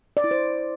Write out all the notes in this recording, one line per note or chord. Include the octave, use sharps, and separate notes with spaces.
D5
E4
C5